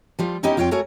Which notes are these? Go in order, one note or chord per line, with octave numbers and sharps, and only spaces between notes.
F3 G3 F4
B3 C#4 D#4 E4 G4 D#5
F2 F4 C#5 F5 G5
A3 F#4 A#4 C#5 G#5